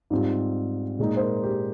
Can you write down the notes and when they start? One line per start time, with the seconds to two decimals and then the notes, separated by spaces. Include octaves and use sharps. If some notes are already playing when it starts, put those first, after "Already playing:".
0.10 G#2 G3 C4 F4
0.99 A#2 G#3 D#4
1.17 C5
1.21 A#4
1.43 G4